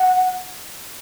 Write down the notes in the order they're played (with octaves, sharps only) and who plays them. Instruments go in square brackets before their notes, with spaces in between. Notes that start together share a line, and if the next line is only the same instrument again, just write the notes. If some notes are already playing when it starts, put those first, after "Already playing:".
Already playing: [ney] F#5